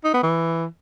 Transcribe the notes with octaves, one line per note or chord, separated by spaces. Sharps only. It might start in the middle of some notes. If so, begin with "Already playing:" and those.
D#4
B3
E3